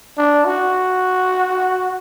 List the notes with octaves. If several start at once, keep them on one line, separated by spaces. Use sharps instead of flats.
D4
F#4